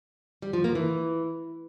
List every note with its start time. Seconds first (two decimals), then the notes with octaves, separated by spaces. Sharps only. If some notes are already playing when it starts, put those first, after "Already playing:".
0.42 G3
0.53 F3
0.64 A#3
0.75 E3